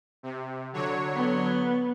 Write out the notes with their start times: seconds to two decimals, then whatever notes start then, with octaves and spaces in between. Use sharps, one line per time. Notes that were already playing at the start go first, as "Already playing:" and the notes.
0.23 C3
0.73 D3 F#3 C#5
1.15 B3